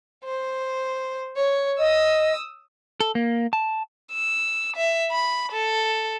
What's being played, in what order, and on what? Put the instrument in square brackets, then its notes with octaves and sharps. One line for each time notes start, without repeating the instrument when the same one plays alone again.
[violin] C5
C#5
[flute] D#5 [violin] D#6 E6
[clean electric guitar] A4
A#3
A5
[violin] E6
E5
B5
A4